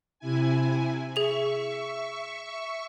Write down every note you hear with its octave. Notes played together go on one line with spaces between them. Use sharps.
C3 E4 G#5
G#4 E5 C#6 F7